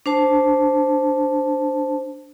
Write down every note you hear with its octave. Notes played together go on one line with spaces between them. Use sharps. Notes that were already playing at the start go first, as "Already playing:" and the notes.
D4 C5 A5